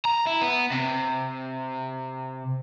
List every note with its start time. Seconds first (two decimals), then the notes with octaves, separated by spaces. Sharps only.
0.05 A#5
0.27 E4
0.42 B3
0.72 C3